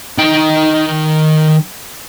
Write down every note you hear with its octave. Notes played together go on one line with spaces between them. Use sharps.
D#3 G5